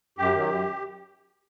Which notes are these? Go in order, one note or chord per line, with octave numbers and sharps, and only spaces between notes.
F#2 G4
D#3 F#3
F#2